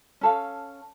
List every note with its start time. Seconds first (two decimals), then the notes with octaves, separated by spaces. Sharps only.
0.21 C#4 A4 F5